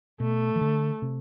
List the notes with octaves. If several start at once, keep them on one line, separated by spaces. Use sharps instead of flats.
B2 A3
E3
D3
C3